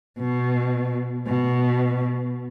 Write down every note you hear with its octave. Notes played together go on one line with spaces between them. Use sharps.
B2
B2